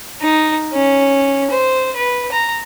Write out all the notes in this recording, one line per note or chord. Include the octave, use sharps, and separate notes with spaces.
D#4
C#4
C5
B4
A#5